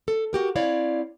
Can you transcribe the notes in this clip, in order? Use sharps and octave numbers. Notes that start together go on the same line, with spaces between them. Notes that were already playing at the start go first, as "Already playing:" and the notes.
A4
F#4 G4 A#4
C4 E4 C#5 D5 F5